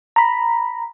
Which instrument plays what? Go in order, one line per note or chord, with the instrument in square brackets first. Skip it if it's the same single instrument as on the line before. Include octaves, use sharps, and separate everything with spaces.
[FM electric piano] A#5 B5